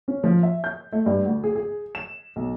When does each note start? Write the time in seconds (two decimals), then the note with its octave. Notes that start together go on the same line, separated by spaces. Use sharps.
0.08 C#4
0.24 F3
0.43 E5
0.64 G6
0.92 A3
1.06 G2
1.26 D2
1.44 G#4
1.56 G#4
1.95 E7
2.36 B1